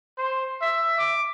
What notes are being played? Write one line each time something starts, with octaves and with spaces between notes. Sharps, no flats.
C5
E5
D6